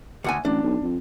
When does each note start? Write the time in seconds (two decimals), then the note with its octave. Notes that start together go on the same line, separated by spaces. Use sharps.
0.24 D2 F#5 G#5
0.45 A1 D4
0.63 B1
0.82 F2